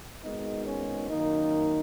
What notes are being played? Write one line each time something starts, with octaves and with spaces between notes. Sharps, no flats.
G#1 G#2 D#3 G#3 B3 D#4
C#4
F#2 D#3 A#3 D#4